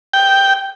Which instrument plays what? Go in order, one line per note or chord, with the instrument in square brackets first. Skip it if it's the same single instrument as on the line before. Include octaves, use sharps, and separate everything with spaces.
[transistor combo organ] G5